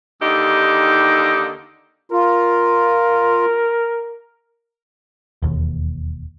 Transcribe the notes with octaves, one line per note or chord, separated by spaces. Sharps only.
D#2 D3 D#4 G4
F4 A#4
E1 D#2